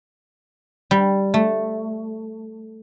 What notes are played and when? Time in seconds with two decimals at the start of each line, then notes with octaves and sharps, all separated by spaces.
0.91 G3
1.34 A3